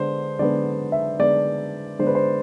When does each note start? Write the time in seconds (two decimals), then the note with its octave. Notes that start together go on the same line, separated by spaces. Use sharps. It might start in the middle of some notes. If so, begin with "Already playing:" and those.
Already playing: D3 G#3 B3 D4 C5
0.39 D3 G#3 B3 D4 D5
0.92 E5
1.19 D3 G#3 B3 D4 D5
1.99 D3 G#3 B3 D4 C5
2.07 B4
2.15 C5